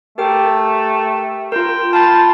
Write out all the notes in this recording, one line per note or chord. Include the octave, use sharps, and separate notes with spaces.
A3 G4 A#4 G5
F4 A#4 G5
F4 A5 B5 A6